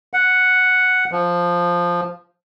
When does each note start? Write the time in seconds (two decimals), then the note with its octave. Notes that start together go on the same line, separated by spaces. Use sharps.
0.14 F#5
1.12 F3